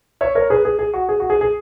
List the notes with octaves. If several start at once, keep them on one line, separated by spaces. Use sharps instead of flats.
C#5 E5
A#4 C#5
G#4 B4
G#4
G#4
F#4
G#4
F#4
G#4
G#4